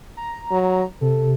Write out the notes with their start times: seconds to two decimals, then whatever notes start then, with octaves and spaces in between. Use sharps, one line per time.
0.17 A#5
0.51 F#3
1.01 C3 A4